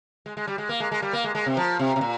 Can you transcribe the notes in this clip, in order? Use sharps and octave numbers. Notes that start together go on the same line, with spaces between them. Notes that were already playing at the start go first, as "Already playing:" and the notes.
G#3
G#3
G3
G#3
A#3
G#3
G#3
G3
A#3
G#3
G#3
C3
F3
C3
C3
A#2